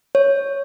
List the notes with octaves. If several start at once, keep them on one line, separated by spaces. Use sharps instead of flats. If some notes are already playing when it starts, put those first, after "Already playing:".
C#5